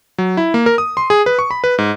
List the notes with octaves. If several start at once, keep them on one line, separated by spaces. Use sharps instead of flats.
F#3
E4
A#3
A#4
D#6
C6
G#4
B4
C#6
B5
B4
G#2